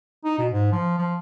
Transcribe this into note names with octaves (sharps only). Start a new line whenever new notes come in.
D#4
B2
G#2
F3
F3